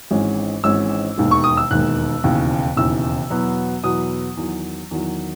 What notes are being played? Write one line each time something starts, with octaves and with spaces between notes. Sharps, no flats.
G#1 G#2 E3 G#3 C#4
G#1 G#2 E3 G#3 C#4 E6
E1 D#2 D#3 G#3
C#6
D#6
E6
E1 D#2 D#3 G#3 F#6
E1 D#2 C#3 E3
E1 D#2 C#3 E3 E6
E2 B2 F#3 B3
E2 B2 F#3 B3 D#6
E2 D#3 F#3
E2 D#3 F#3